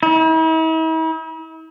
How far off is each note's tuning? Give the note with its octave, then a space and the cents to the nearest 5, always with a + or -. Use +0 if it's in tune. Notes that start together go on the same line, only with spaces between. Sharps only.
E4 -45